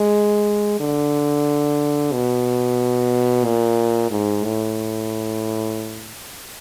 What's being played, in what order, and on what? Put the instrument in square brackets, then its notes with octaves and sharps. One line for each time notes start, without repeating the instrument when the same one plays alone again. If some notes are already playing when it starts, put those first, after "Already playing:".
Already playing: [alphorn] G#3
D3
B2
A#2
G#2
A2